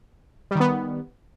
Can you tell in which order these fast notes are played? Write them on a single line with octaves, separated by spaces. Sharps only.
G3 D#3 B3